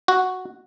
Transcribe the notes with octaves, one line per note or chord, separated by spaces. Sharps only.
F#4